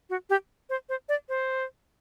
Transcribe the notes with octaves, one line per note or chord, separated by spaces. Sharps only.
F#4
G4
C5
C5
D5
C5